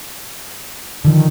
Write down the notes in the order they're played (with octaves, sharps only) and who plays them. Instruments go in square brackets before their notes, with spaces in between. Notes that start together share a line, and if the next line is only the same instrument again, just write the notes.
[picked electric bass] D3 F3 [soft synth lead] D#3